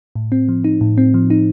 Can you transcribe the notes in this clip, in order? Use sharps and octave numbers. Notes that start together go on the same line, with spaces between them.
A2
C4
F3
D#4
A2
C4
F3
D#4